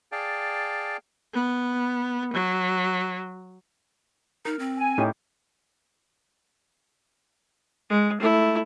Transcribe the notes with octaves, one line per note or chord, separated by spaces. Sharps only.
G#4 D5 F5 G5 A5
B3
F#3
D#4 A#4
C4
G#5
A2 C#4 D#4 G4
G#3
A3 E4